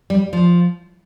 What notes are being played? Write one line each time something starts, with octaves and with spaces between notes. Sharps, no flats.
G3
F3